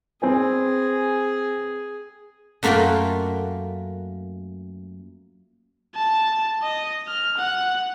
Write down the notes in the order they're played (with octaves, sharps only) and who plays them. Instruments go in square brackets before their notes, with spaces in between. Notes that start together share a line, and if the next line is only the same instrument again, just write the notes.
[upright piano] C4 B4 G#5 [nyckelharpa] G#4
[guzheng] F#2 A3 A#3 F4 F#4 G5
[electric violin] A5
D#5
F6
F#5